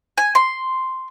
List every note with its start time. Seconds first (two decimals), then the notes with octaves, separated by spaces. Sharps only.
0.18 G#5
0.35 C6